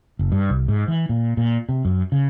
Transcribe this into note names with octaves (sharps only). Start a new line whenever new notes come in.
F#1
G2
C2
G#2
E3
A#2
A#2
C3
F#2
C#3